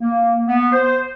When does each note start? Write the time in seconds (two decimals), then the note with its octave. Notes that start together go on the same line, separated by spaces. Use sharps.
0.01 A#3
0.47 B3
0.72 C5